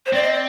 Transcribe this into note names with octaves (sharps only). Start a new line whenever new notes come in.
C5
C4 D5
D#5
D5